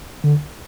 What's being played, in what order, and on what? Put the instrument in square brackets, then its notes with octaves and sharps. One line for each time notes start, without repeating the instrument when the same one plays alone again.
[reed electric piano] D3